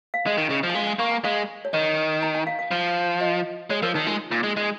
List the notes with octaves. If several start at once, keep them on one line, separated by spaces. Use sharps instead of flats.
F5
G#3 D#5
D#3
C#3
F3
G#5
G#3 F5
G#5
A#3 C#6
G#5
G#3 F5
C#5
D#3 D#5
A#5
G#5
F5
F5
F3
D#5
G#3 C#5
F3 A#4
D#3 D#4
G#3 F4
A#2
G#3
G#3